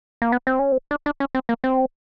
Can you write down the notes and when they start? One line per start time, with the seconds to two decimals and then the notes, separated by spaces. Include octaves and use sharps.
0.22 A#3
0.32 B3
0.47 C4
0.59 C#4
0.72 C4
0.91 D4
1.06 D4
1.20 C#4
1.35 C4
1.49 A#3
1.64 C4